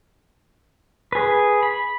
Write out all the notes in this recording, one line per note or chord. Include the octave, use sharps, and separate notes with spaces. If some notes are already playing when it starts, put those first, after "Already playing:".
G#4 B4
B5